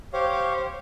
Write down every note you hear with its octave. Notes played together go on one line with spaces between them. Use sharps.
G4 C5 C#5 F5